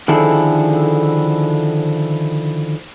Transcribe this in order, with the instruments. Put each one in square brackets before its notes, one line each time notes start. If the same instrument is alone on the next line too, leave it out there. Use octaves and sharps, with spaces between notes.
[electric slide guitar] D3 D#3 F3 E4 G#4 A4